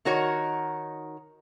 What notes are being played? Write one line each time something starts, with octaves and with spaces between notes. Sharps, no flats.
D#3 D#4 F#4 A#4 C#5